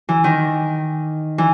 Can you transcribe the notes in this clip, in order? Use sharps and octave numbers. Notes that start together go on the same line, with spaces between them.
E3
D#3
E3